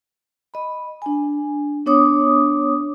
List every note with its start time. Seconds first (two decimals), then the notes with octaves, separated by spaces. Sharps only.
0.54 D#5 B5
1.02 D4 G#5
1.86 B3 D4 C#5 D6 D#6